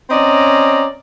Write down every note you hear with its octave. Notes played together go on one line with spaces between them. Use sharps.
C4 C#4 D5 D#5 A#5